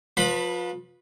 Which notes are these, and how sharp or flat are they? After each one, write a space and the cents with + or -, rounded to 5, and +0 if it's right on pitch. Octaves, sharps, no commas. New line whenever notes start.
F3 +30 B4 -20 B5 +0